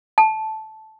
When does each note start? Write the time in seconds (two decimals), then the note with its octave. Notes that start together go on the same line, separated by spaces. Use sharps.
0.18 A5